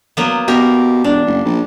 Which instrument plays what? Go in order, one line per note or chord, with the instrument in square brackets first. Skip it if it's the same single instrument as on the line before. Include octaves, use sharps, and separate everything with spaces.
[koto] F#3 A#3 B3
[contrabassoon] B2 [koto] G4 A#4
[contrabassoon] E1 [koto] D4
[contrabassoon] F#1
A#1